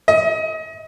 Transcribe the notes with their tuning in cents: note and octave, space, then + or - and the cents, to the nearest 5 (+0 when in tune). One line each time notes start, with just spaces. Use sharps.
D#5 +30